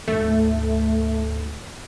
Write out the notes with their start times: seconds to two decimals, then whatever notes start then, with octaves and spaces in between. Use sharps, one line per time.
0.08 D2 G#2 A3